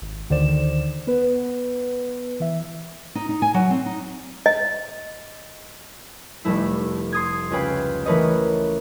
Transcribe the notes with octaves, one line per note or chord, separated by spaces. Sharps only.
G#1
D2 D3 D#3 C5 D5 E7
B3 B4
E3 E5
D#4
D#4
G#5
F#3
C4
D#4
D#5
F1 G3 A3 E4
C6 D#6 G#6
C#2 C#4 F4 G#4 B4 G5
E3 A3 A#4 B4 C#5 D#5